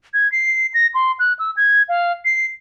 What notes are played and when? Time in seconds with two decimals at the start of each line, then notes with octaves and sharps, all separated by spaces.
0.14 G#6
0.32 C7
0.74 A#6
0.94 C6
1.20 F#6
1.39 E6
1.57 G#6
1.89 F5
2.25 C7